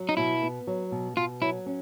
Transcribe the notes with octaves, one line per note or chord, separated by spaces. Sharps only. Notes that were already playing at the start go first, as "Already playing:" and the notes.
Already playing: F#3
D#4
B2 E4
B3
F#3
B2
B2 F4
F#3 E4
C#4